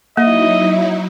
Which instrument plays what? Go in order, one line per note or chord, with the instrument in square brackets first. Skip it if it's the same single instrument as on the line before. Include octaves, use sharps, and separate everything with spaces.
[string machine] F#3 D#4 E4 [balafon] A#3 [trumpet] D#5 [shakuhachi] E5